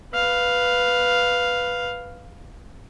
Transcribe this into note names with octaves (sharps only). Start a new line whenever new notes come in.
B4 F5